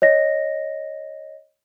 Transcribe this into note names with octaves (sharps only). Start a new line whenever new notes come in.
C#5 D#5 A#6